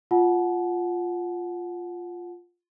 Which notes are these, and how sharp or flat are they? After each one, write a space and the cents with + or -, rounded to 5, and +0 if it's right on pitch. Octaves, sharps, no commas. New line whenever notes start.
F4 +0 F#5 -10 A5 -40